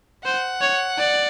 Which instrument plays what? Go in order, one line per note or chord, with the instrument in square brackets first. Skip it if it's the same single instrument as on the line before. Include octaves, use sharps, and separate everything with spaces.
[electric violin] C5 [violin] F#5
[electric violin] C#5
D5